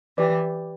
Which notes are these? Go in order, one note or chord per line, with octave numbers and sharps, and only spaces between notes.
E3 G4 B4 D5